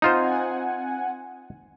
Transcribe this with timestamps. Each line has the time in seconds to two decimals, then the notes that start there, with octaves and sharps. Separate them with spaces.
0.02 C4 D#4 F4 C5 F#5 G#5